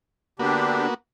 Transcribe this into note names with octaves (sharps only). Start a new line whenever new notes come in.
D3 A#3 B3 D4 F#4 G4